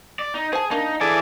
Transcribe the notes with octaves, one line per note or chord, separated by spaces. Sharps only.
D5
D#4
G#4 C5 A5
A#3 D4 D#4 A5
E3 G#4 A4 D5